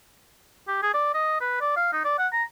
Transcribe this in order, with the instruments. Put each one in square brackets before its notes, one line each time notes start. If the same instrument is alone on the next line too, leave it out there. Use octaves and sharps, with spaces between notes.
[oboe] G4
G#4
D5
D#5
B4
D5
F5
D#4
D5
F#5
A#5